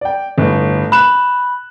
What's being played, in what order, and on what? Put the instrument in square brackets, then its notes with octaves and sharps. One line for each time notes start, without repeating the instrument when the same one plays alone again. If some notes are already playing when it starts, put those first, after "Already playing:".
[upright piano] D5 G5
G1 A2
[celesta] B5 [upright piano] F#6 E7